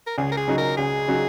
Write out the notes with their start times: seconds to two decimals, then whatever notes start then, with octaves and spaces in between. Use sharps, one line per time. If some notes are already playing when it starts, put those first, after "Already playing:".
0.07 A#4
0.18 C#2 G#4
0.32 A#4
0.37 G#4
0.48 C#3 F#3 D#4 F#4
0.58 A#4
0.77 C#2 G#4
1.08 C#3 F#3 D#4 F#4